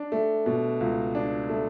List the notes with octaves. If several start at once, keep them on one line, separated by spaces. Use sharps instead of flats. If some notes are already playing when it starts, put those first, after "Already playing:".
Already playing: D4
A3
B2
C#2
D4
A3